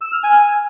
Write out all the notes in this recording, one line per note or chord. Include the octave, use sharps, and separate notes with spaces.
E6
F6
G#5